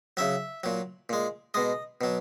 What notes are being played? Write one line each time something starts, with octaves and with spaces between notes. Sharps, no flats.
C#3 F#3 E5
A#2 F#3
A#2 G#3
B2 G#3 D#5
B2 F#3